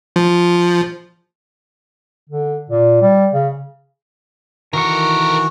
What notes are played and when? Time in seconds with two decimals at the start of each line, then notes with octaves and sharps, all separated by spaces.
0.16 F3
2.29 D3
2.70 A#2
3.01 G3
3.33 C#3
4.73 D#3 E3 F#4 A4 A#4 C#6